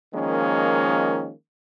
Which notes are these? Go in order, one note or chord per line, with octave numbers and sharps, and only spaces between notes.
D#3 F3 G#3 A#3 C#4